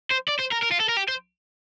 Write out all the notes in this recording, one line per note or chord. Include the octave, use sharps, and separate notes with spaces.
C5
D5
C5
A#4
A#4
F4
A4
A#4
G4
C5